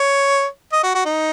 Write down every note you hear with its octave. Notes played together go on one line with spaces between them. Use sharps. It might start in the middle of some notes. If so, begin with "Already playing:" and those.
Already playing: C#5
D#5
F#4
F#4
D#4